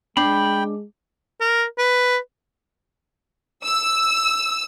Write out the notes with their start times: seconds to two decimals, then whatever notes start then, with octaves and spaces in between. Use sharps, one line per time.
0.17 G#3 D4 G5 B5
1.41 A#4
1.78 B4
3.65 E6